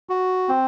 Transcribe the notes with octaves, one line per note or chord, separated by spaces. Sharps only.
F#4
C4